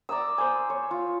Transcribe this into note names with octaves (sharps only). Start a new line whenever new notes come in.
D5 A#5 D#6 E6
C5 G#5
C#5
F4